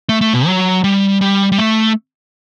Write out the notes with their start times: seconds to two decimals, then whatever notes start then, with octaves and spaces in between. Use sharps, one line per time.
0.09 A3
0.21 A3
0.33 B2
0.47 F#3
0.84 G3
1.21 G3
1.52 G3
1.58 A3